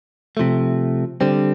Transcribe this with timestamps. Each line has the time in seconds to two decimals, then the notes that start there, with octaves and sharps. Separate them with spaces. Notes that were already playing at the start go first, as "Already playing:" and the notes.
0.37 C3 F3 A3
1.21 D3 G3 C4